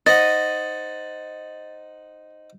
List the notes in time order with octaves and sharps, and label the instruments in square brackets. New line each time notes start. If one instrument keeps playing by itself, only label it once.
[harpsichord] D#4 C5 F#5 [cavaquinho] D#5 [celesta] A6